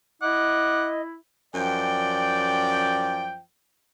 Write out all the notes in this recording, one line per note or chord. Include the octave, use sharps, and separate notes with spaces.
E4 D#5 F#5 D6
F#2 F3 D5 G5